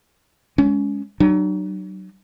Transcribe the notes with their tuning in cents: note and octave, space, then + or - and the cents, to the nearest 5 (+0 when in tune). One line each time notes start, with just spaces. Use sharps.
G#3 +0 C#4 +25
F#3 +35 D4 +45